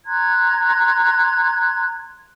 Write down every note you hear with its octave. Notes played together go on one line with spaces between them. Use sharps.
A#5 C6 F#6 G#6